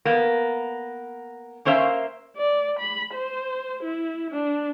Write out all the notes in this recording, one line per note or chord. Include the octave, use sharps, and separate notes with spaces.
A#3 B3
A#3 C#4 C5 E5 F5
D5
B5
C5
E4
D4